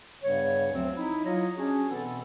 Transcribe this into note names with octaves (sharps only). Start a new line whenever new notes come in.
G2 C#3 G3 B3 C#5
D2 F3 F#3 C4
D#4 E4
F#3 F4 C#5 D#5
C#4 D4 F#4 G#4
B2 E3 B3 C4 A4